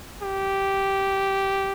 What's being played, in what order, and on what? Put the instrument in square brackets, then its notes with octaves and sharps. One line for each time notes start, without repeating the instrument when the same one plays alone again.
[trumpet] G4